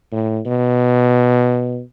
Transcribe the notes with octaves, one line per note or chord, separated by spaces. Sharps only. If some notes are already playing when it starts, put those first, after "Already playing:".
A2
B2